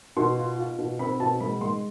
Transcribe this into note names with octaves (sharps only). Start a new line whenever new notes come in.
B2 C6
F4
F4
B2
C4 B5
B2 A5
G#3 B5
G#3 C6